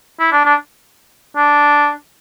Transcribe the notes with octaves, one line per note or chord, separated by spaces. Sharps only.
E4
D4
D4
D4